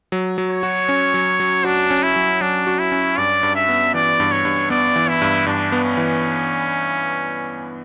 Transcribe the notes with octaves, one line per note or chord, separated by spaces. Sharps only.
F#3
F#3
C#5
F#4
C#4
F#3
F#3
D4 F#4
C#4
E4
F#3
F#3 D4
F#4
E4
C#4
G2 D5
G2
E5
B3
E3 D5
G2
C#5
G2
B3 D5
E3
E4
G2
G2 D4
B3
C#4
E3